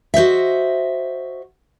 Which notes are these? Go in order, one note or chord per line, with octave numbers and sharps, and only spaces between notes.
F#4 C5 D#5 E5